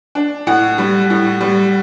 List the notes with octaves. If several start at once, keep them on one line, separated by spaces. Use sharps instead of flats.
D4
A2 F#5
G3
A2
G3